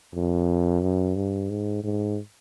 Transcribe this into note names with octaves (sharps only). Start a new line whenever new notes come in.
F2
F#2
G2
G#2
G#2